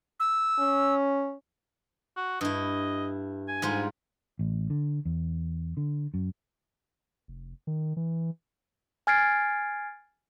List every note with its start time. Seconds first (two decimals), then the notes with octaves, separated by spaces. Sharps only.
0.20 E6
0.59 C#4
2.17 F#4
2.41 G2 E4 D#5
3.48 G#5
3.62 G#2 G3 F4
4.39 A1
4.70 D3
5.05 E2
5.77 D3
6.14 F#2
7.28 F1
7.67 D#3
7.97 E3
9.07 G#5 F6 G#6 A6 C7 D7